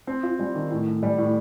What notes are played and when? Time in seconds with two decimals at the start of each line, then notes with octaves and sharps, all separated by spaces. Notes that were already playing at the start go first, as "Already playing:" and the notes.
0.07 C4
0.23 F4
0.39 G3
0.55 D#3
0.71 A2
0.87 A2
1.03 G3
1.18 A2